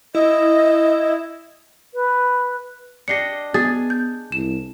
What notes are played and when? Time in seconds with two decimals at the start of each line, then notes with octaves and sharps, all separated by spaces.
0.15 E4 D#5
1.94 B4
3.08 D4 G4 D#5 A#6 C7 C#7
3.54 B3 G#4 A6
3.90 G6
4.32 C2 E7